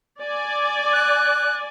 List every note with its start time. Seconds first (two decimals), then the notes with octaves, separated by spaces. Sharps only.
0.22 D5 G#5
0.92 F#6